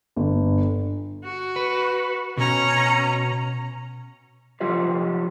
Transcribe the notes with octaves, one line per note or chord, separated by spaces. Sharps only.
G1
F#4
B4
B2 C#4 A#5
F3 F4 G4 C#5 D#5